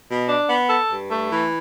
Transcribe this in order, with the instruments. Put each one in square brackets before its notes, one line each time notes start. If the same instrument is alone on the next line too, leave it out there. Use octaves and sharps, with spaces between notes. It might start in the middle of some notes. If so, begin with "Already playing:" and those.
[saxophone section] B2
D4
B3
A4
G2
A3
E3